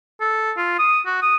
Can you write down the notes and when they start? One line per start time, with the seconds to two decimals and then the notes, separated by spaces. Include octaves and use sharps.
0.21 A4
0.57 F4
0.79 D#6
1.06 F#4
1.22 D#6